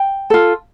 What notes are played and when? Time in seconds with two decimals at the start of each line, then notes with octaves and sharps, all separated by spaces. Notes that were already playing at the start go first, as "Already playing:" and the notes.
Already playing: G5
0.30 F4 A4